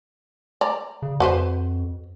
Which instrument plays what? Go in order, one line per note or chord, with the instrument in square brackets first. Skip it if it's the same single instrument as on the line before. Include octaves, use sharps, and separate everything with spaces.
[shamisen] D5 A#5
[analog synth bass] C#3
[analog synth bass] F2 [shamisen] F#4 B4 C5